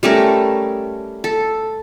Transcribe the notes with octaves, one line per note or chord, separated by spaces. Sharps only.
G3 A3 C#4 A#4
A4